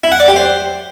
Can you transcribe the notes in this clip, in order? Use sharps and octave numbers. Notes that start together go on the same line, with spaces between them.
E4
F#5
D5
G4
C5